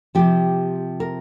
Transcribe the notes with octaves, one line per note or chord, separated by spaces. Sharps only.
C3 F3 G4
A#4